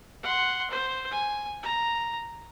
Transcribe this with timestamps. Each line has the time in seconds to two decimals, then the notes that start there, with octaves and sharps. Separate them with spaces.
0.23 F#5 C6
0.71 C5
1.11 G#5
1.63 A#5